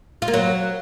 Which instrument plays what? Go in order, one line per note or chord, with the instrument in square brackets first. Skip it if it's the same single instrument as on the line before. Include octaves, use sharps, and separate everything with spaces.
[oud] F4
A#3
F#3